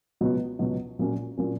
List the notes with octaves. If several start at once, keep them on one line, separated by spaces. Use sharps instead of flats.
C#2 B2 F#3 B3
C#2 B2 F#3 B3
A#1 A#2 F#3 A#3 C#4
A#2 F#3 A#3 C#4